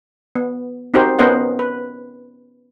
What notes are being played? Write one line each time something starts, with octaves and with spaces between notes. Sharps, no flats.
B3
C4 D#4 F#4 G4 A#4 C5
B3 C#4 A#4 C5 D#5 F#5
B4